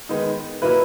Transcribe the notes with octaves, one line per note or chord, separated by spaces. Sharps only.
D#3 G#3 B3 D#4
A#2 F#3 A#3 E4 B4